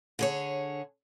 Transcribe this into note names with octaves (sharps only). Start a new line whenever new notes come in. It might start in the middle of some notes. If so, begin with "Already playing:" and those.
D3 G#4 C#5